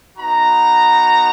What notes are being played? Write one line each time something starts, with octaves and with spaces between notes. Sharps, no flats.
B3 D#4 F#4 A#5